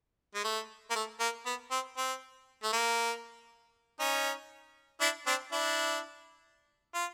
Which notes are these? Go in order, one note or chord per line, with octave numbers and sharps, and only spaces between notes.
G#3
A3
A#3
A3
A#3
B3
C4
C4
A3
A#3
C#4 D#4
D4 E4
C4 D4
D4 E4
F4